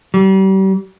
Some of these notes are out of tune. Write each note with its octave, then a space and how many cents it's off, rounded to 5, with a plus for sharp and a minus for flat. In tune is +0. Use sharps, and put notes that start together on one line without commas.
G3 -35